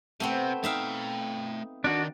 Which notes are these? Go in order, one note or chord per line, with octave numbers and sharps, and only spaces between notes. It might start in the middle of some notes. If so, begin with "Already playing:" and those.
C3 A3 B3 C4
A3 D#4 E5 F5 G5
D#3 D4 F#4